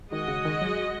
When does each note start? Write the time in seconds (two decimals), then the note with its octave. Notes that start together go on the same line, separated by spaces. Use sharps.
0.11 D#3 G#3 F#4 D#5
0.28 C#3
0.45 D#3
0.61 F#3